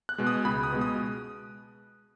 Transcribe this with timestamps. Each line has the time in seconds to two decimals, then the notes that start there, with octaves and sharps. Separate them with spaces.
0.09 F#6
0.18 B2 G#3
0.27 D#6
0.45 C#2 B5
0.63 D#6
0.72 B2 G#3
0.81 D#6